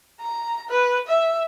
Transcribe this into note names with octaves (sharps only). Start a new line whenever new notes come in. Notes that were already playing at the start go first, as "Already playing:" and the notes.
A#5
B4
E5